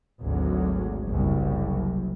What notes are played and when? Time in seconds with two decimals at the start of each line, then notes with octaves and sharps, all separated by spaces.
0.21 G#1 D2 F#3
1.06 F#1 C2 F#2